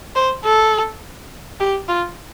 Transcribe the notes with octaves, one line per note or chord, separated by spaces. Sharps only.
C5
A4
G4
F4